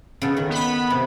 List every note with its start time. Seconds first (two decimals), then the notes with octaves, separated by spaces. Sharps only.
0.22 C#3 B3 A4
0.37 D#3
0.50 B3 B5
0.90 C3